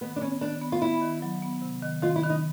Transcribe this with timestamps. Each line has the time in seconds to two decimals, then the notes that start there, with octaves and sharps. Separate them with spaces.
0.01 D#3 B3
0.16 D4
0.21 B3 C#4
0.41 D#3 D4
0.62 B3
0.72 F4
0.82 B3 E4
1.01 D#3
1.22 F#3
1.42 B3
1.62 C3
1.82 D#3
2.02 D#3 F4
2.16 E4
2.23 D#3
2.30 D#4